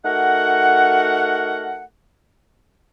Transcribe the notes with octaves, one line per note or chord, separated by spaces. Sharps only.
A3 D#4 F#4 A#4 F#5